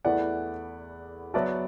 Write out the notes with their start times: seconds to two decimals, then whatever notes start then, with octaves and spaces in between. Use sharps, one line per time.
0.05 E2 E3 A3 E4 B4 D5 F#5
1.34 F#3 B3 F#4 D5 E5 A5